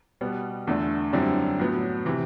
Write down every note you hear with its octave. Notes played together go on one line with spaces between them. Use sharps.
B2 G3 B3
E2 D3 A3 D4
F#2 D3 G3 C4 E4
A2 F#3 B3
C3 E3